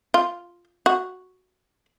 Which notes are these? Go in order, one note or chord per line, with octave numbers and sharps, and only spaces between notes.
F4
F#4